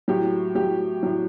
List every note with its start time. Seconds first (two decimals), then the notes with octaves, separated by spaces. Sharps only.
0.08 A2 F#3 G4
0.55 A2 F#3 G4
1.03 A2 F#3